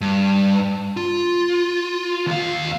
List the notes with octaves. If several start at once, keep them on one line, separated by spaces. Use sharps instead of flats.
G2
F4
D#2 F5